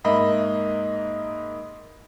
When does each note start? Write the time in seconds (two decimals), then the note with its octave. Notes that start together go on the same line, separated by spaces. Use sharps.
0.04 G#2 A#3 D#5 E5 B5